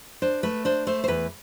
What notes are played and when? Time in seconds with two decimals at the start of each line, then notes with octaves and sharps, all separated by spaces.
0.22 D4 C5
0.43 A3 B4
0.65 D4 C5
0.87 A3 C5
1.04 C5
1.08 E2 B4